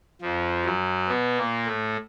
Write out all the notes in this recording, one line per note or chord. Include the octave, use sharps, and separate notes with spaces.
F2 F3
F#2 F#3
B2 B3
A#2 A#3
A2 A3